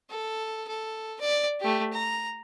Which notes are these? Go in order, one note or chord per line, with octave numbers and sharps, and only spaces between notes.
A4
A4
D5
A3 G4
A#5